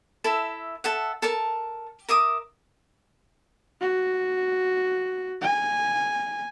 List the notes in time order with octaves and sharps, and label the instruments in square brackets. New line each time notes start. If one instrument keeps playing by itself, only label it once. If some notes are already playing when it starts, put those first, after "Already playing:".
[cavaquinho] E4 A4 E5
A4 E5 F#5
A4 A#4 A5
A#4 E5 D6 D#6
[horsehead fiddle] F#4
G#5